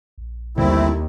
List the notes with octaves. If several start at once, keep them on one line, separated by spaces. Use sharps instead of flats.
A#1
D#2 D3 G3 A3 A#3 C4 E4